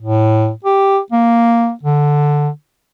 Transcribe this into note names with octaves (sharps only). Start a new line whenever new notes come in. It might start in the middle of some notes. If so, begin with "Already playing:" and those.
A2
G4
A#3
D3